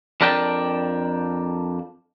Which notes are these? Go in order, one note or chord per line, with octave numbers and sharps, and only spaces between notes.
F2 D4 A#4 D5 G5 A5